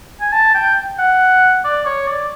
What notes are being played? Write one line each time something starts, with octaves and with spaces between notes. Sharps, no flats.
G#5
A5
G5
F#5
D5
C#5
D5